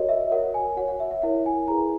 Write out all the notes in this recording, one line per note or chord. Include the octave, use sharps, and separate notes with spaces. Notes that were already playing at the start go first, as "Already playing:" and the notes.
Already playing: F#4 A#4 C#5 D#5
E5
F#4 A#4 C#5 F#5
G#5
F#4 C#5 F#5
F#5
E5
E5
E4 A#4 C#5 F#5
G#5
E4 G#4 B4 A#5